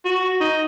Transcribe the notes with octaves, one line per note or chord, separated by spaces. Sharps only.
F#4
D#4